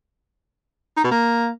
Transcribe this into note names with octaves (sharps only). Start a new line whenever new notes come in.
D#4
B2
A#3